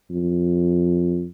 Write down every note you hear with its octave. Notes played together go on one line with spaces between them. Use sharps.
F2